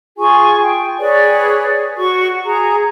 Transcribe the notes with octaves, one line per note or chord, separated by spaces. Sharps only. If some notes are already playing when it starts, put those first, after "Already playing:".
F4 G#4 G#5 C#6
G5
G#4 B4 C#5 D5
F#4 C#6
G#4 A#5